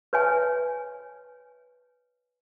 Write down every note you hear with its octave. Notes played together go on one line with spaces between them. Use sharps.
B4 C#5 E5 G#5